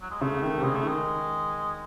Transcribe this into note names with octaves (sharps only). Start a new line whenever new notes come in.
F#3
G#3
C#3 A3
D#3 A3
C3
C#3 G#3
A3
D#3 G#3